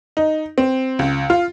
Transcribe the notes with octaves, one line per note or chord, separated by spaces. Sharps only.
D#4
C4
C#2
F4